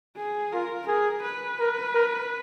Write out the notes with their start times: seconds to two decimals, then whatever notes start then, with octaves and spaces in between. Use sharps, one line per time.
0.17 G#4
0.52 F4 A#4
0.87 G#4 A#4
1.23 B4
1.59 A#4
1.94 A#4